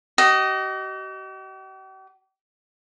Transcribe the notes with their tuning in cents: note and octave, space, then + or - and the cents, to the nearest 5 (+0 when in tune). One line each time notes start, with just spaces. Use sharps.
G4 -45 D#5 +0